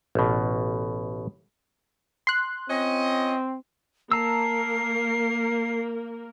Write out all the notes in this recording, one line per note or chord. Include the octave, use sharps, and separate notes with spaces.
A1 B2
C6 F#6
C4 C#4 F4 D#5
A#3 A#4 A5 A#5 E6 C7